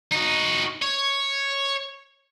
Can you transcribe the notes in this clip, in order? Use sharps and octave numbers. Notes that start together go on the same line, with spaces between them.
D#4 F#4
C#5